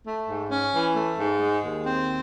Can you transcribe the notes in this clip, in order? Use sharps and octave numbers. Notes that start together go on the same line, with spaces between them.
A3
G#2
C#4
E3
A3
G#2
G#3
D#2
C4